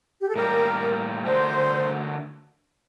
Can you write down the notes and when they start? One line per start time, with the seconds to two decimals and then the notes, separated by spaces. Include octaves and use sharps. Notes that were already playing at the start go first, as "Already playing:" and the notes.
0.21 G4
0.28 A4
0.36 A2 G3 A#3 D#4 G4 A#4
1.26 D3 A3 D4 F#4 A#4 C5